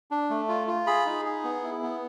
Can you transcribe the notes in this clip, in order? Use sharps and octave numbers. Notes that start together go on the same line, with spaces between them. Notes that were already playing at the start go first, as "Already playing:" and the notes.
D4
A3
F4
F4
G#4 B5
D#4
G#4
B3
E4
B3